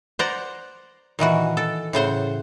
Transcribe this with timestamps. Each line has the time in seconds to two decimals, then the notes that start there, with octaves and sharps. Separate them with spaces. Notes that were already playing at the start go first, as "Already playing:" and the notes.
0.19 C5 D5 F#5 A#5
1.19 A#2 D#3 E3 F#4
1.57 A4
1.93 A2 C#3 C5 F#5